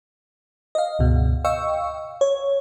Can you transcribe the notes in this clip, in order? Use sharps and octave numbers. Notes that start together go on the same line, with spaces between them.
D#5 F5
C#2 G2 B2
D#5 F5 G5 C#6 E6
C#5